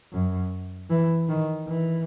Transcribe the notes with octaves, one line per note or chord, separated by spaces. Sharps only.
F#2
E3
D#3
E3